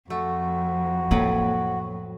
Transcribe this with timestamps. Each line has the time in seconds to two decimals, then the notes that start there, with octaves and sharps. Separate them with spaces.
0.10 F2 A3 F#4
1.11 A2 F#3 A#3 B4